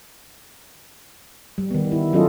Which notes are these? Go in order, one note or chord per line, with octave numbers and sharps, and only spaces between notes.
G3
D#3 B3
E4
F#3 C#4 F4 A4 D#5